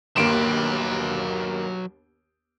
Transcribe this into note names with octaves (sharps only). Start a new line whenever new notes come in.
G1 D#2 F#3 A#3 B4 C6 D7 E7